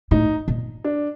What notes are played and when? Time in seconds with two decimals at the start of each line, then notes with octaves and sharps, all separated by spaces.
0.11 A2 D#4
0.48 A#2
0.84 D4